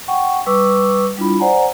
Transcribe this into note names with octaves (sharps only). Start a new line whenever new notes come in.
F#5 G5 C#6
G3 B4 C#6 D6 E6
G3 D4 E4 F4 B5
C5 D5 F#5 G#5 A#5